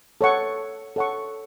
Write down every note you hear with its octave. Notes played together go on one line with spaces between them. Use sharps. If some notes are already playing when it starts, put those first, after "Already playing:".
A4 C#5 F#5 C#6
A4 C#5 F#5 C#6